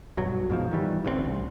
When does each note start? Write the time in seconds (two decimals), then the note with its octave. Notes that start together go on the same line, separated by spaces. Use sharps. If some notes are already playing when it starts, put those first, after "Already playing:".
0.17 B1 G2 F#3
0.50 G#2 B2 E3 F3
0.71 D#3 E3 G3
1.05 A1 D2 G#3 C4
1.25 C2